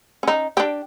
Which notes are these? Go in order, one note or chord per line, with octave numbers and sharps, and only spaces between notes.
C#4 D#4
D4 G4